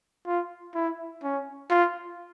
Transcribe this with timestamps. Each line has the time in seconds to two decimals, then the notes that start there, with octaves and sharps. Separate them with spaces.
0.27 F4
0.75 E4
1.23 C#4
1.70 F4